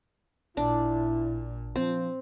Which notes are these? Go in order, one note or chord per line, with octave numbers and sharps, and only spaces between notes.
A1 A#2 D4 E4
F3 C4